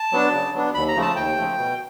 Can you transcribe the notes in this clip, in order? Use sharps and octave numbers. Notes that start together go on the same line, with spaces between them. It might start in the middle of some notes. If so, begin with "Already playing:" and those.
Already playing: A5
F#3 B3 D4
C#3
F#3 B3 D4
D#2 B5
A#5
C#3 F3 A3
A5
D#2 G5
C#3 F3 A3
B2